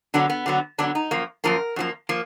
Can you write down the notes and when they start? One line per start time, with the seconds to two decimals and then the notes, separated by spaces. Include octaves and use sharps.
0.14 D3 F#3 B3 D4
0.30 B3
0.46 D3 F#3 B3
0.78 D3 F#3 B3 D4
0.95 D#4
1.11 F#2 F3 A#3
1.44 F#2 F3 A#3 A#4
1.76 F#2 F3 A#3
2.09 F3 A#3